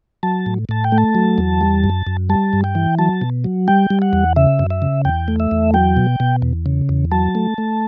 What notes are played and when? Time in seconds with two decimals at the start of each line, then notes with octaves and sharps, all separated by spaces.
0.23 F#3 A5
0.46 A2
0.69 A2 A5
0.84 G5
0.92 A3
0.98 A5
1.15 F#3
1.38 E2
1.61 G3
1.84 F#2
2.07 F#2
2.29 G3 A5
2.53 G2
2.64 G5
2.75 E3
2.99 F#3 A5
3.21 B2
3.44 F#3
3.68 G3 G5
3.90 G3
4.02 F#5
4.13 E2
4.36 C#3 E5
4.59 F#2
4.70 E5
4.82 C#3
5.05 E2 G5
5.28 A3
5.40 E5
5.51 E2
5.74 F#3 G5
5.97 B2
6.20 B2
6.42 E2
6.66 C#3
6.89 E2
7.12 F#3 A5
7.35 A3
7.58 A3